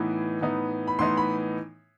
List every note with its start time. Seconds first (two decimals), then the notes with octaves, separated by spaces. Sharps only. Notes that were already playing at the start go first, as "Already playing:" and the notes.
Already playing: A2 E3 B3 D#4
0.41 A2 E3 B3 D#4
0.88 B5
0.99 A2 E3 B3 D#4 C6
1.17 B5